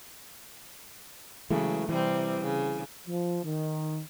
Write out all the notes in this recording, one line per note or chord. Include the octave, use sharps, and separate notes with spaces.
C#3 E3 F#3 G#3 A3
C3 E3 G3 C4
C#3
F3
D#3